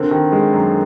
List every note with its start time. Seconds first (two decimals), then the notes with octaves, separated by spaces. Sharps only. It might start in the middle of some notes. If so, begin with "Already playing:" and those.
Already playing: D3 C4 A#4
0.11 D#3
0.32 G#3
0.53 F#2